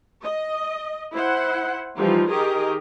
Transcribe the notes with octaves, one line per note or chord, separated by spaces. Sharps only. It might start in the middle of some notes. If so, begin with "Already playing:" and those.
D#5
E4 C5 F#5
E3 F3 G3 D#4 F4
D#3 G4 G#4 A#4 D#5